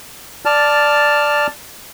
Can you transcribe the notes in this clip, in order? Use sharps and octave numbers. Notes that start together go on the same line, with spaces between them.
D5 A5 F6